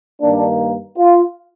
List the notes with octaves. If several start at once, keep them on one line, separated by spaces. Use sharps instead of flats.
G2 D#3 A#3 D4
F4